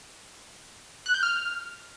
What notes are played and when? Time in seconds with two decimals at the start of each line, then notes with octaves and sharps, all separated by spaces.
1.06 F#6
1.14 G6
1.23 F6